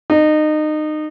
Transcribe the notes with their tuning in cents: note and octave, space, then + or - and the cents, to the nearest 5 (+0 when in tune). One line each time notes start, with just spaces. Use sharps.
D#4 -25